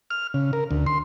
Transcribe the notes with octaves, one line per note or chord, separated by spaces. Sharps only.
F6
C#3
A#4
D2
C6